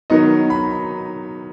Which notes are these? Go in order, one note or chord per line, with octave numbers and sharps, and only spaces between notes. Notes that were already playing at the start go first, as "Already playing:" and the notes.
D#3 F#3 B3 D#4 D#5
B5